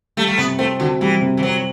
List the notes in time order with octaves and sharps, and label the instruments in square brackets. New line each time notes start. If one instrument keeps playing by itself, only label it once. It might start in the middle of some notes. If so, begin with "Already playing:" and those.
[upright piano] G3 [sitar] A3
[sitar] A3
[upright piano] C3 [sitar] B3
[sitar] A3 [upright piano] C4
[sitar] D3 [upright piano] F#4
[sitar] E3 [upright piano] G3
[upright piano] C3
[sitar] E3
[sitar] F#3 [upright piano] C4